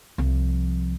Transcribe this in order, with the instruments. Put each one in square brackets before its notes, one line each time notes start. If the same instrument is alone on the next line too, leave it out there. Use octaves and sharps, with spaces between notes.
[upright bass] C2 F3